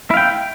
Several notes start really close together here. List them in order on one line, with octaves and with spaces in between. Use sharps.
E4 F5 G5